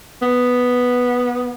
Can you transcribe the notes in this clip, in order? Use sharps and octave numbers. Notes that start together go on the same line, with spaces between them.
B3